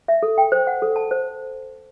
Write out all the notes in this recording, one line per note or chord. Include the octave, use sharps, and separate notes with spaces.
E5
A4
G5
C5
F#5
A4
A5
C5